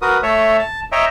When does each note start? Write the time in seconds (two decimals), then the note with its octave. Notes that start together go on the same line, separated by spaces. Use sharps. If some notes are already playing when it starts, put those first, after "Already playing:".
0.02 F#4 A#4 B4 D#6
0.23 A3 C#5 E5
0.59 A5
0.92 C#5 D#5 E5 G5 A#5